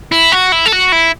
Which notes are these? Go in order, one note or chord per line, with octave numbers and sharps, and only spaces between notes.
E4
F#4
E4
A4
F#4
E4